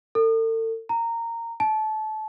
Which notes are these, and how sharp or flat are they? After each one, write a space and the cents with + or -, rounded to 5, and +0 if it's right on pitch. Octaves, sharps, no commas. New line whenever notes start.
A4 +40
A#5 -15
A5 -25